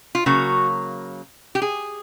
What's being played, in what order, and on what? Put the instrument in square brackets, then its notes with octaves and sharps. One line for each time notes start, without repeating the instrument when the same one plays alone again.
[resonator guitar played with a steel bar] F4
C#3 F#3 A#3 F#4
G4
G#4